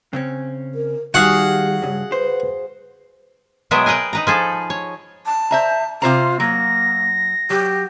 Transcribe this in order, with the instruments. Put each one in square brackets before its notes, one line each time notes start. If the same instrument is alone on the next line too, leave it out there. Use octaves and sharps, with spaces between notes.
[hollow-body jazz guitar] C#3 C4 C#4
[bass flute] A#4
[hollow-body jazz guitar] D#3 [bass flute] G3 [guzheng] F#4 G#4 F5 [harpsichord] F#5
[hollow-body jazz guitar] G2 C#3
[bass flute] B4 [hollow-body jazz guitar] C5
[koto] B2 F#3 G#3 B3 E5 G5
G#4 A#4 B4 D#5 G5
D#4 B4 A#5
F3 G#4 A4
C#5
[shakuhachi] A5
[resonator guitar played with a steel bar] C5 E5 A#5
[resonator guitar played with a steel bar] C3 C5 A#5 [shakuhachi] F4
[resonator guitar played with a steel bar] F#3 [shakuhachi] A#3 [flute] A#6
[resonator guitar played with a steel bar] F#3 [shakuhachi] G4